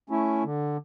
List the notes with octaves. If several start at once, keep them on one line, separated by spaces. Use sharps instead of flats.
A3 C#4 E4
D3